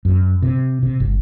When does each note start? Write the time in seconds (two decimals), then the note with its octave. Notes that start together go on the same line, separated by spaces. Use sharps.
0.05 F#2
0.42 C3
0.83 C3
1.00 G1